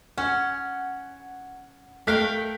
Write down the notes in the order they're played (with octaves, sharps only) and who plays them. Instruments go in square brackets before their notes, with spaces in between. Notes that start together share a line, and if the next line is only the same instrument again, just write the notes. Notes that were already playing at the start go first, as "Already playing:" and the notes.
[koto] C#4 [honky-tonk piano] F#5
[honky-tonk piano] A3 F#6 B6 [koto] A#4 F5 G5